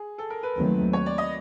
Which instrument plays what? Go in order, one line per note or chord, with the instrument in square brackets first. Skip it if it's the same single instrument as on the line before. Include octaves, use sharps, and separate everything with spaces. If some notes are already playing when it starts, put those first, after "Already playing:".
Already playing: [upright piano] G#4
A4
A#4
B4
[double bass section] D#2 D#3 F#3 A3 C4
[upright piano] C#5
D5
D#5